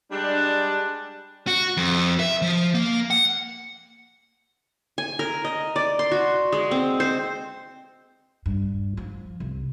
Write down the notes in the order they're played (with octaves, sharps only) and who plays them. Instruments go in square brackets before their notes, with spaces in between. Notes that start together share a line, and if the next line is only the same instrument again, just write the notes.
[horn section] G3 G#3 D4
[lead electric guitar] F#4
F2
E5
F3
A#3
F#5
[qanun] G#5
A#4
D#5
D5
C6
F#4
G#3
C4
C5
[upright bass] G2
F3
C2